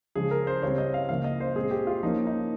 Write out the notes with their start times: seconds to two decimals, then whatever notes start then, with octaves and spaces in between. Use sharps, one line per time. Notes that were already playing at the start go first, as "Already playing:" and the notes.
0.15 C#3 F3 G#3 G#4
0.31 A#4
0.47 C5
0.62 C#3 G3 C4 C#5
0.78 D#5
0.94 F5
1.09 C#3 F3 A#3 F5
1.24 D#5
1.40 C5
1.55 A#2 G#3 C4 G#4
1.71 G4
1.87 F4
2.03 F3 A#3 C#4 D#4
2.27 D#4